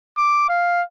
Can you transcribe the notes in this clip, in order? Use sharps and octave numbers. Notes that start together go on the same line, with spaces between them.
D6
F5